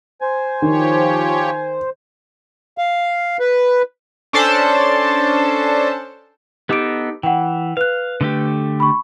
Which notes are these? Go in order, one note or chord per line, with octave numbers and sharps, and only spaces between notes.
C5 G#5
D#3 F3 G4 C#5
F5
B4
C#4 D4 A4 C5 A5
B3 D#4 G4 A4 D6 D7
E3 F#5 G5
B4 F5 F#6
D3 A3 G4
B5 C#6